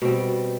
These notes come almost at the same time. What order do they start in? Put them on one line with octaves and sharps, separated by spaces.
B2 C4 G3